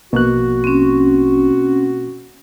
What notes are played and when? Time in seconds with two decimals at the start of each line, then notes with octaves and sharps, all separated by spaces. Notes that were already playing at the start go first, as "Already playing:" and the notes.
0.13 A#1 B2 A#3 F#4 F#6
0.64 C4 C#4